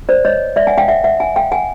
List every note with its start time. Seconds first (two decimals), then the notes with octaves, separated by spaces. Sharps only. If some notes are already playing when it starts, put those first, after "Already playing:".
0.09 C5 D5
0.25 C#5 D#5
0.56 D5 E5
0.67 F#5 G#5
0.78 F5 G5
0.88 E5 F#5
1.04 E5 F#5
1.20 F#5 G#5
1.36 F5 G5
1.52 F#5 G#5